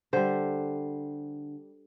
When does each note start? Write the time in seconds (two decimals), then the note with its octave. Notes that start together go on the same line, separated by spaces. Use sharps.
0.13 D3 G3 C5